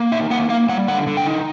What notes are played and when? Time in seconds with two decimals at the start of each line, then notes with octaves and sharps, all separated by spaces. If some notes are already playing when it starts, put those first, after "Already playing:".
Already playing: A#3
0.12 D#4 E5
0.30 A#3 F#5
0.49 A#3 F5
0.69 G3 F#5
0.88 D3 F#5
1.07 D3
1.17 G5
1.26 D#4